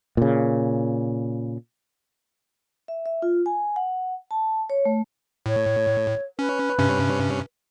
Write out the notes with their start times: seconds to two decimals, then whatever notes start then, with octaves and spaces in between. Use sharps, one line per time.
0.17 A#2 C#3
2.88 E5
3.06 E5
3.22 F4
3.46 G#5
3.76 F#5
4.31 A5
4.70 C#5
4.85 A3
5.46 A2 C#5
6.39 C#4 B4
6.79 G2 C3 C#4